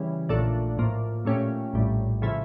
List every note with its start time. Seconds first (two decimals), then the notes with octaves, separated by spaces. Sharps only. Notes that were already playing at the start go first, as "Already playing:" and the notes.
Already playing: C#3 E3 G3 C#4
0.29 A#1 A#2 A3 D4 A4
0.77 A2 F3 A#3
1.25 A#2 A3 C#4 G4
1.73 A#1 A2 G3
2.22 C#3 F3 A3 E4